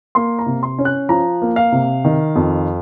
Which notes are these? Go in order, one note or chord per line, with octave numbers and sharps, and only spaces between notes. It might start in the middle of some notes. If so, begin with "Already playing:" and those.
A#3 C6
A#5
C3
C6
C#4
F#6
F3 A#5
A#3
F5
C3
D#3
F2